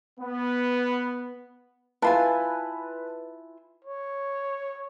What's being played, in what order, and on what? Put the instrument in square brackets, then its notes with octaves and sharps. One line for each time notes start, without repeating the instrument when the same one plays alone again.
[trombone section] B3
[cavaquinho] E4 F4 G#5 [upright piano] B4 A5
[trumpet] C#5